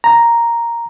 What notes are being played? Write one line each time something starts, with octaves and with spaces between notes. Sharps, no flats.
A#5